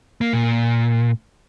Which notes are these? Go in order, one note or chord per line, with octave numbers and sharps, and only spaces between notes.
A#3
A#2